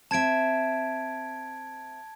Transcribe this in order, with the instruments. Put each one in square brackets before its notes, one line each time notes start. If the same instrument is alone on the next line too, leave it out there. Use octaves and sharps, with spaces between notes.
[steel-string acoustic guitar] C4 E5 [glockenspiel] A5 G#6 D7